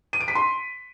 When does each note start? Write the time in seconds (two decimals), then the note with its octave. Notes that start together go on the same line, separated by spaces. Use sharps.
0.13 D#7
0.21 D7
0.28 B6
0.35 C6